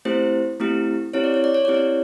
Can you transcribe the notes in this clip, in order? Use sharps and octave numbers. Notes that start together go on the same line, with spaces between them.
A3 C4 E4 G4 C5
A3 C4 E4 G4
C4 E4 G4 C#5
D5
C#5
D5
C#5
C4 E4 G4 D5
C#5